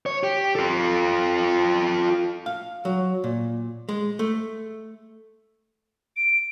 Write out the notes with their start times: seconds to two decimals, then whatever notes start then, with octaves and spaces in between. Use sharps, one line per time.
0.06 C#5
0.24 G4
0.56 F4 A4
2.46 F5
2.85 F#3
3.24 A#2
3.89 G#3
4.19 A3
6.17 D7